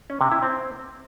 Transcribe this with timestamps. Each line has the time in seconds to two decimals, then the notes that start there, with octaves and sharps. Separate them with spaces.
0.10 C#4
0.21 C3
0.32 E4
0.42 C4